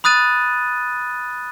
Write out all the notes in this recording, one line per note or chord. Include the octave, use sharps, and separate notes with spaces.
B5 D#6 F#6 A6 D#7